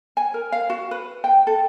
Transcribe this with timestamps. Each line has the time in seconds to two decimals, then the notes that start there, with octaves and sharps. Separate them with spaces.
0.17 G#5
0.34 A#4
0.52 F5
0.70 F#4
0.91 B4
1.24 G5
1.47 A4